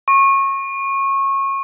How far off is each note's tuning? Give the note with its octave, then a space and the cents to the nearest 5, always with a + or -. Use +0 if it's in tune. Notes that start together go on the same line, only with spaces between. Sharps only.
C#6 -25